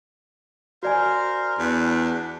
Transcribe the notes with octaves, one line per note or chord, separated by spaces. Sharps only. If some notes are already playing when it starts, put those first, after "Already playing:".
F#4 A#4 C5 D5 F5 G#5
E2 D4